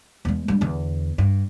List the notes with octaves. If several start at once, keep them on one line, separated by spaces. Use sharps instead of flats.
E2 G#3
G3 D4
E2 D3
G2